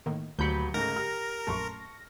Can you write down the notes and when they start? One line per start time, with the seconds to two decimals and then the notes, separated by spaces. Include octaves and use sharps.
0.06 A2 D#3 A#3
0.39 D#1 D2 D3 F#3 B5 G6 C#7
0.74 G#2 C#3 A3 A#4 A#6
0.96 G4 F6
1.47 A#1 F#2 A3 A5 C6 C#6